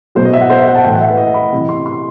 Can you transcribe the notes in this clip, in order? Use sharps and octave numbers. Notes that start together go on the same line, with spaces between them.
B2 F#3 C5
D#5
E5
F#5
C5
E5
F#5
A5
A2 E3 G5
F#5
E5
B4
D#5
B5
C3 E3
C6
C6